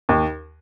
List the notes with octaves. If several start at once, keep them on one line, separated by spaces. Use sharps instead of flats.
D#2